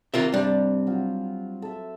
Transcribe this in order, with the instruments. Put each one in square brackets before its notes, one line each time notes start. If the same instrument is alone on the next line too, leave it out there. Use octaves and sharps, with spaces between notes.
[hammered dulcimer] C3 [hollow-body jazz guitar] F4 A#4 E5
[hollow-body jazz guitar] G3 D4
[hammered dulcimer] F#3 F4
A4 E5